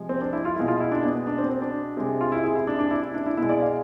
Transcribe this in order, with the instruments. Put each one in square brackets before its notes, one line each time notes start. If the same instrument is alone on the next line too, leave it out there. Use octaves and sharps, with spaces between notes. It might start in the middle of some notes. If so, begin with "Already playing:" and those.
Already playing: [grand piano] C3 F3 G#3
C4
D4
E4
F4
B2 G#3 E4
F4
E4
D4
B3
B3
D4
C4
C4
D4
C3 G#3
F4
E4
G#4
E4
D4
D4
E4
E4
D4
E4
B2 G#3 E4
D5
F5